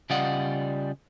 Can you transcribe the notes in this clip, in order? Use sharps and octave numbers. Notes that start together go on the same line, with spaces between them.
C#3 G3 F4 D5 D#5 F#5